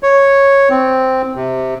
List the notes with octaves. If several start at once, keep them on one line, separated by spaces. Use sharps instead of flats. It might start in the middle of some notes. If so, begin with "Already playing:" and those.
C#5
C4
C3